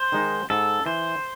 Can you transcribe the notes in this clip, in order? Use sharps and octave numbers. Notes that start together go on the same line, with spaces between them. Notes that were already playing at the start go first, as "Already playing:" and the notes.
Already playing: C5
D#3 G#3 D#4
G#2 A4
E3 C5